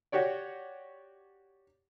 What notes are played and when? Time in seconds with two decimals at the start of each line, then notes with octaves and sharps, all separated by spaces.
0.12 F#4 G4 C#5 D5